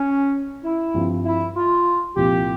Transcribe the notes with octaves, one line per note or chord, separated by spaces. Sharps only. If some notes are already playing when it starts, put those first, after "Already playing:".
Already playing: C#4
E4
G2 F3 C4
E4
F4
C2 A#2 F3 G4